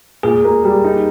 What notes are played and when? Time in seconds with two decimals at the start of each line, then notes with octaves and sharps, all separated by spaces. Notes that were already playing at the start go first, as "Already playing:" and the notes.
0.23 A#2 G#4
0.44 A#3
0.64 G3
0.84 D#4